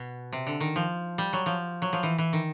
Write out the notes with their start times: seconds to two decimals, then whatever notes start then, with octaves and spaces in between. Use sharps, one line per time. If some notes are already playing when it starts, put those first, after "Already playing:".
Already playing: B2
0.33 C3
0.47 D3
0.60 D#3
0.76 F3
1.18 G3
1.33 F#3
1.46 F3
1.82 F#3
1.93 F3
2.03 E3
2.18 E3
2.33 D#3